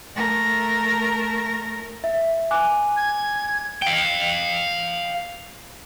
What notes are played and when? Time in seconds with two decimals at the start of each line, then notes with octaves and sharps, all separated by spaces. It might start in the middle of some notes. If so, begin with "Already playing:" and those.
0.15 A3 A#4
2.04 E5
2.51 G#5 D6 F#6
2.97 G#6
3.82 F5 G5